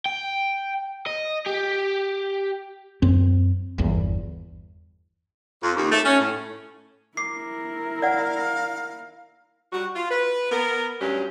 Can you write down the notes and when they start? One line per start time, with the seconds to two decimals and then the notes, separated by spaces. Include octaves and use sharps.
0.06 G5
1.06 D#5
1.46 G4
3.02 F#2 C4
3.78 G1 E2
5.63 F2
5.76 D#2
5.91 A3
6.05 C#4
6.20 A2
7.17 E4 A#4 D6 C7
8.02 D5 F5 F#5
9.72 G3 F#4
9.94 F4
10.10 B4
10.51 B3 A#4
11.00 D2 G2 F#3 C#4 G4